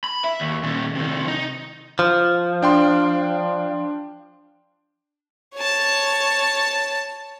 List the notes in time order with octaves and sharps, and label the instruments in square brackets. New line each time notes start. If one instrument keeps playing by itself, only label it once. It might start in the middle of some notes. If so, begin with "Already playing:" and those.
[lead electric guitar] B5
E5
D#2
A#2 D#3
C3 D#3
D#4
[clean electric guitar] F3
[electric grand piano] D4 G5 C6
[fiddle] C#5 A5